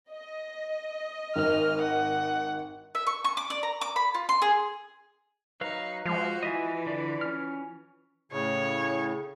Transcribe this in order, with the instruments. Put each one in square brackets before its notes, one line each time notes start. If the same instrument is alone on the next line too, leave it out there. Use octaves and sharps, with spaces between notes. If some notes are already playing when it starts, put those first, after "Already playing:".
[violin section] D#5
[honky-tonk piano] G#1 [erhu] F6
[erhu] F#5
[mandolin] E5
C#6
C#6
D6
D5
A#5
D6
B5
F4
C6
G#4
[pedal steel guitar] F#3 B4 F5 [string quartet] D#4
[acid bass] F3 [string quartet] G#3 F#4 C5 [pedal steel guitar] F5
[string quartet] E3 [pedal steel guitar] D#5 E5 G#5
[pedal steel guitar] D3 D5
C#4 F6
[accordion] A2 C#3 [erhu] C#5